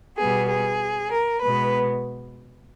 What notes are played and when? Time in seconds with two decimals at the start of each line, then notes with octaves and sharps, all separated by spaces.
0.17 B2 G3 B3 G#4
0.49 G#4
1.11 A#4
1.41 B2 G#3 B3 B4